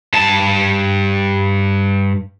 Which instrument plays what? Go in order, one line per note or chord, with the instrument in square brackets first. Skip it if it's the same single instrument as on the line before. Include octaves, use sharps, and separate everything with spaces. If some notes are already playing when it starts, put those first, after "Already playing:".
[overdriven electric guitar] G2 A5